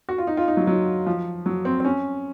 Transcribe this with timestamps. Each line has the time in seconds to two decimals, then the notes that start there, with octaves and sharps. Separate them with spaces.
0.09 F#4
0.18 F4
0.27 D#4
0.37 F4
0.48 D#4
0.57 F#3
0.67 F#3
1.07 F3
1.46 F#3
1.65 C4
1.80 C4
1.85 C#4